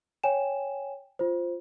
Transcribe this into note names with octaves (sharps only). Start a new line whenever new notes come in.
C#5 G5 G#5 E7
F4 C5